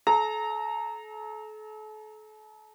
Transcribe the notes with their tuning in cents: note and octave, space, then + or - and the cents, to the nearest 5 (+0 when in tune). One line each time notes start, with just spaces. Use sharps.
A4 -40 A#5 -10